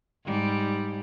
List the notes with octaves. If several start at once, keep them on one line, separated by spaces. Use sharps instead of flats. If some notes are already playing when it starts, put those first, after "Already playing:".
G#2 G3